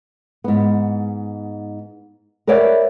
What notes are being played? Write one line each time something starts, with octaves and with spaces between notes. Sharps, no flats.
G#2 B3
A#4 B4 C#5 D5 E5 F#5